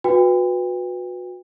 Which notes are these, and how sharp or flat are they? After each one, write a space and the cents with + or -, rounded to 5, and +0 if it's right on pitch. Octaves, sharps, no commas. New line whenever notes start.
F#4 -30 B4 +0 G5 +35